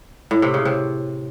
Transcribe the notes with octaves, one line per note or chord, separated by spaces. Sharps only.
A2
C3
C#3
C3